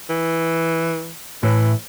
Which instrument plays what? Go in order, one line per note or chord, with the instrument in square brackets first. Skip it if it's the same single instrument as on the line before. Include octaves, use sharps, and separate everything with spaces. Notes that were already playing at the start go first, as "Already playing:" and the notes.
[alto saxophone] E3
[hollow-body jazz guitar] A2 [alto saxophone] E3